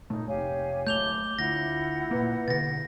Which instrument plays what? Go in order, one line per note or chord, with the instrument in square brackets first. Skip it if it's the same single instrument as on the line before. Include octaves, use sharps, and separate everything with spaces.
[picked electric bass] A#2 A3 [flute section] D#4
[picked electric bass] F1 [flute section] G4 F5 G#5 [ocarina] C#5
[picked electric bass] D1 C#2 A3 [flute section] D6 [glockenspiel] G6 F7 G7
[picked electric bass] D2 [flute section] E4 F#5 [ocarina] F4 [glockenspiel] A#6
[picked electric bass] A#2 A#3 [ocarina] B4
[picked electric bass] B2 D3 [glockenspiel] A6 A#6